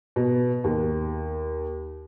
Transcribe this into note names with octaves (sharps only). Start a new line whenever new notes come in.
B2
D#2